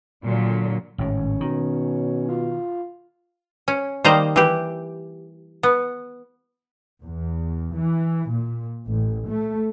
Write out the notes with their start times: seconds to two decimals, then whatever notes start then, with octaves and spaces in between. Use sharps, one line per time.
0.24 A#2 D3 F#3
0.98 G#1 A2 C#4
1.41 B2 D#3
2.29 F4
3.68 C#4
4.04 D#3 G3 A#3 C5 D#5 A#5
4.36 E3 G4
5.63 B3
7.02 E2
7.77 E3
8.31 A#2
8.87 A1
9.28 A3